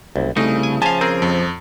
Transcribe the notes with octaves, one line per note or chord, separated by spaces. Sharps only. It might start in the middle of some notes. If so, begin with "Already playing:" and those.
F#1 C2
C2 C#3 A3 D#4
G#5
C#3 F3 E5 F5 G#5 A5
C4 G#4 A#4
F2